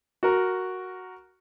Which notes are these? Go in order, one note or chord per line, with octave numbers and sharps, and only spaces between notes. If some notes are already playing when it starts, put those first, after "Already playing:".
F#4 A#4